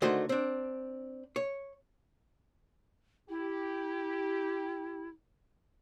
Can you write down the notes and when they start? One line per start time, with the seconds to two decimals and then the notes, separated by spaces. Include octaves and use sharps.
0.02 D3 D#3 A3 D#4 F#4 C5
0.29 C4 D4
1.36 C#5
3.29 E4 G4